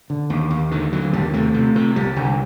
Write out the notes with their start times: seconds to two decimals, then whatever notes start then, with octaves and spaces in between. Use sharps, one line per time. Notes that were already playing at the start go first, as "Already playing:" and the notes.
0.10 D3
0.30 D#2
0.50 D#2
0.71 D3 D#3
0.92 D3 F#3
1.13 D#2 G3
1.33 C3 A3
1.54 C3
1.76 C3
1.96 C2 G3
2.16 C2 D3